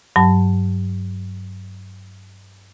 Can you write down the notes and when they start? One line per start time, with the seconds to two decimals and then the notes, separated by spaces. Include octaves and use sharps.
0.16 G2 F#3 A5